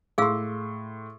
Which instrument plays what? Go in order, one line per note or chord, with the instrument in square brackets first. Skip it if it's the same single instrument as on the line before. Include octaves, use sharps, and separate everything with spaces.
[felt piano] A2 C6 [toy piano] G#4 F5 E6